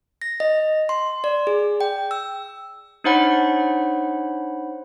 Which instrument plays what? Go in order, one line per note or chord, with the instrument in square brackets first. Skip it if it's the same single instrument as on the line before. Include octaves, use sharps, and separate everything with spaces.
[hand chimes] A#6
D#5
C6
D5
G#4
G5
E6
[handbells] D4 D#4 C5 C#5 F#5 B5